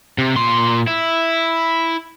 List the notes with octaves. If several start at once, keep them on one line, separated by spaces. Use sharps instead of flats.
C3
A#2 C6
E4